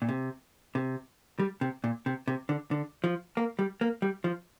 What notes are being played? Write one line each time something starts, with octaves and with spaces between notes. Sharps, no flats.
A#2
C3
C3
G3
C3
A#2
C3
C3
D3
D3
F3
A#3
G3
A#3
G3
F3